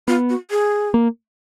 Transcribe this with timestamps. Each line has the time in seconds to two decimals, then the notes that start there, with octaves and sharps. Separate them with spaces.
0.08 B3 F4
0.30 F#4
0.51 G#4
0.94 A#3